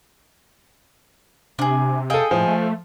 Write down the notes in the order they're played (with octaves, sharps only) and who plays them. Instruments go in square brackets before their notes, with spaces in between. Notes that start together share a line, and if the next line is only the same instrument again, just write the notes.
[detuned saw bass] C3 [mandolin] D4 G#4
[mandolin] G#4 D#5 G5 [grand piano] A4 F5
[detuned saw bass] A2 [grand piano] F3
[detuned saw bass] A3